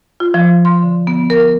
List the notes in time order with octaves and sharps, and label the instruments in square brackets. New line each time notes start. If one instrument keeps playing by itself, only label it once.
[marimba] F4
F3
C6
D3
B3
A#4